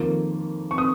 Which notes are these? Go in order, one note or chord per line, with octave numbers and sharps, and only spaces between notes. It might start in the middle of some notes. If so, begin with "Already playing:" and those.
Already playing: F2 D#3 A#3 F4
C#6
D#6